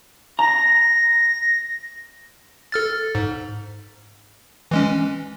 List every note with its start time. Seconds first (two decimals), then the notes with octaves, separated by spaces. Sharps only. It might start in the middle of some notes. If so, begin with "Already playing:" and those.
0.39 A#5 A#6
2.72 A4 F6 A6
3.15 G#2
4.71 E3 G#3 C#4